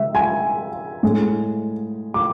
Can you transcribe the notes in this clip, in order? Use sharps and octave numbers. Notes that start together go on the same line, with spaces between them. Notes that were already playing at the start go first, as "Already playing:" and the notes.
Already playing: C#3 G#3 E5
G#5
A2 G#3
D6